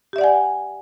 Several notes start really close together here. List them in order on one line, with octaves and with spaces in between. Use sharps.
G4 E5 D5 F#5 G#5